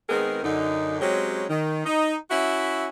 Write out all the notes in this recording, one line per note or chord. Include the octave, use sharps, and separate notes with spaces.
D#3 G#3 B3 C4 G#4 A#4
F#2 D3 D#4
F#3 G#3 C4 C#4 G4 C#5
D#3
D#4
C#4 E4 F#4 E5